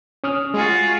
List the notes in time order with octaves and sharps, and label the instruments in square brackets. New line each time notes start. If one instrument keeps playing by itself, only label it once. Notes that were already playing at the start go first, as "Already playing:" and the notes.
[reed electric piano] C#4 D#6 F6
[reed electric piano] G#3 [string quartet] F4 F#4 G#4